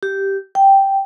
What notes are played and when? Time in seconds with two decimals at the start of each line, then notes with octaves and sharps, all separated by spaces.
0.03 G4
0.55 G5